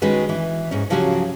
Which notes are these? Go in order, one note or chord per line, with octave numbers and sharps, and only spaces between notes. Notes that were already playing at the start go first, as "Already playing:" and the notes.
D#3 G#3 C#4 F#4 B4
E3
G#2 C#4
C#3 F3 F#3 C#4 F#4 G4